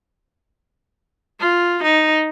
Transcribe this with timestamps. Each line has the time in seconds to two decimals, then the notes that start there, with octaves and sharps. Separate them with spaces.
1.40 F4
1.83 D#4